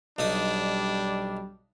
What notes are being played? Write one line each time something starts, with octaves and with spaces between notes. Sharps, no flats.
B1 G3 D4 D#4 D#6